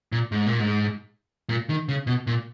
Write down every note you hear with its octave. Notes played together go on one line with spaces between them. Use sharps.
A#2
G#2
A#2
G#2
A#2
D#3
C#3
B2
A#2